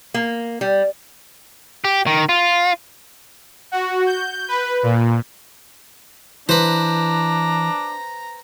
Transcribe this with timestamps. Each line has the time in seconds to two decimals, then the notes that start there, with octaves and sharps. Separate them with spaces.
0.14 A#3
0.61 G3
1.84 G4
2.07 D#3
2.29 F4
3.72 F#4
4.06 G6
4.48 B4
4.83 A#2
6.49 E3 D4 B4 C5 A#5